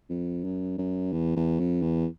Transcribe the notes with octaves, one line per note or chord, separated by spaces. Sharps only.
F2
F#2
F#2
E2
E2
F2
E2